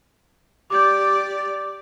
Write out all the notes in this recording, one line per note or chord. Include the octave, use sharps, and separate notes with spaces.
G4 D5 D6 G6